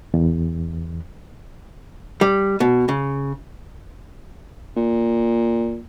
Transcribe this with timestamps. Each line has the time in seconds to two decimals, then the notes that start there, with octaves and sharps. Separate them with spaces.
0.14 E2
2.21 G3
2.60 B2
2.89 C#3
4.77 A#2